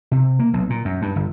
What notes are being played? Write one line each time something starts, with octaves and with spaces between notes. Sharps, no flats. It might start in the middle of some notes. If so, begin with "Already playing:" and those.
C3
A#3
B1
A#2
F#2
G2
G1